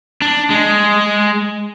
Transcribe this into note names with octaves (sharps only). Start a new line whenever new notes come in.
D4
G#3